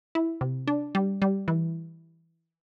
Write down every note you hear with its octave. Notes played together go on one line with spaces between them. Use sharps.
E4
C3
D4
G3
G3
E3